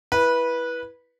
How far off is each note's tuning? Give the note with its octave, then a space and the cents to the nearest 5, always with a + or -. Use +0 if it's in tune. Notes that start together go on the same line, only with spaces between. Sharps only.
E4 +0 B4 -15